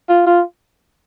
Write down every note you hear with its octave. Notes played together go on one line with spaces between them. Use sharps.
F4
F4